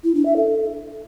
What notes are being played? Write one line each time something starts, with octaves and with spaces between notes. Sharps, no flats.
E4
D4
E5
A4